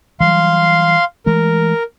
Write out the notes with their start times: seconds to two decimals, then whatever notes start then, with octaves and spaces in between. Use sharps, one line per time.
0.20 E3 F#3 G3 F5 C6
1.26 E3 G#3 A3 A#4